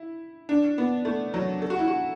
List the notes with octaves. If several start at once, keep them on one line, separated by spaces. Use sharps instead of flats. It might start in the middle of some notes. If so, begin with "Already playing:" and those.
Already playing: E4
D4
B3
A3
F#3
A4
F#4
E4
F#4